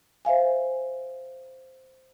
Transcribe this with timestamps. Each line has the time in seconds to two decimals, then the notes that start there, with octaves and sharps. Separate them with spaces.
0.25 C5 E5 F5 G#5